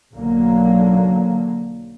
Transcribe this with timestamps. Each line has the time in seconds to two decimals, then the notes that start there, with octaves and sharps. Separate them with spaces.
0.14 B1 D3 F#3 A#3